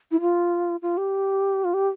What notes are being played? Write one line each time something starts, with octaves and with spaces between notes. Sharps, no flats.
E4
F4
F4
G4
F4
G4